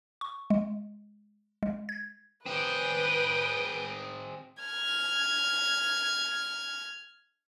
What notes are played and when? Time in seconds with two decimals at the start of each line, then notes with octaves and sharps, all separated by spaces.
0.21 C#6
0.50 G#3
1.63 G#3
1.89 G#6
2.46 C4 G#4 B4 G5 D#6
4.63 F6 G#6